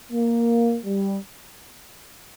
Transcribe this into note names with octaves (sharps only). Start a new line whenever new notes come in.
A#3
G3